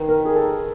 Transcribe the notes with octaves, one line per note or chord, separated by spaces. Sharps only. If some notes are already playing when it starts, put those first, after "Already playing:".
Already playing: D#3 B4
A#4
G#4
A4